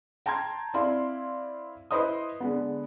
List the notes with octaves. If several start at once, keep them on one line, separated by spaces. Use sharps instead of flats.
G5 A5 A#5 C6 G#6
C4 E4 D5 F5 C6
E4 B4 C5 D#5 C6 D#6
D3 G#3 B3